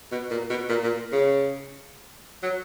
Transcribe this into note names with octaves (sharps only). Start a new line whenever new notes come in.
B2
A#2
B2
A#2
A#2
C#3
F#3